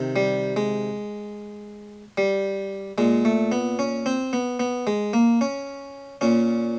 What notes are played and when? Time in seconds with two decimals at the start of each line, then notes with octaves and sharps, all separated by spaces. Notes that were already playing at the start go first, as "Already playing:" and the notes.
Already playing: C3 D#3
0.16 G3
0.56 G#3
2.18 G3
2.98 A#2 G#3
3.25 A3
3.52 B3
3.79 C#4
4.06 C4
4.33 B3
4.60 B3
4.87 G#3
5.13 A#3
5.41 C#4
6.21 A#2 C#4